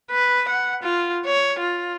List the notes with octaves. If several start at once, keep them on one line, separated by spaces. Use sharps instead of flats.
B4
F#5
F4
C#5
F4